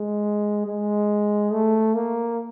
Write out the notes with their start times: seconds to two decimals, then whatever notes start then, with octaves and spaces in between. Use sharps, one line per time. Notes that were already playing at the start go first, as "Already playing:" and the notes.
Already playing: G#3
0.66 G#3
1.52 A3
1.95 A#3